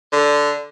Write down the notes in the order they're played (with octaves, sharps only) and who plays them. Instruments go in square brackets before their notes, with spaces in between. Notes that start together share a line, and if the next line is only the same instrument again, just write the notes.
[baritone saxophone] D3